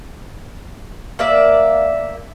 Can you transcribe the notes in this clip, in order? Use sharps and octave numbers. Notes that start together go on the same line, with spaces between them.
A#3 D5 E5